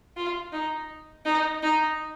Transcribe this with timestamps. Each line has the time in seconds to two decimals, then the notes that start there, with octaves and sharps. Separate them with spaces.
0.16 F4
0.53 D#4
1.25 D#4
1.63 D#4